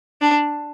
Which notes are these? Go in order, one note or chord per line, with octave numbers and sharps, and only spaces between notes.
D4